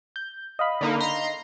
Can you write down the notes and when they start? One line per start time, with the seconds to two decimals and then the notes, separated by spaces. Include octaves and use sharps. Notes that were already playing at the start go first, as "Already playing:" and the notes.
0.16 G6
0.59 D#5 F5 B5
0.81 D3 A#3 D#4
1.00 A#5 C6